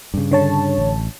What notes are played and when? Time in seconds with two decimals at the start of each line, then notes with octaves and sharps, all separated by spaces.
0.14 G2 C#3
0.31 D3 C#5 A5
0.78 A1